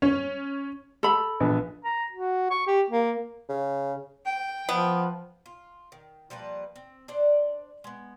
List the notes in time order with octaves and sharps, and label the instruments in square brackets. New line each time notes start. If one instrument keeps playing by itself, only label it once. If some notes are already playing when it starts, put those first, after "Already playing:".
[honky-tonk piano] C#4
[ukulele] A4 B5
[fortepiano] A#1 B3
[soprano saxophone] A#5
F#4
C#6
G4
A#3
[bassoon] C#3
[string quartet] G5
[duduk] F3 [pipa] B3
[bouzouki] F4
D#3
F3 G3 A#3 B4
C4
D4 C5 D5
G#3 B3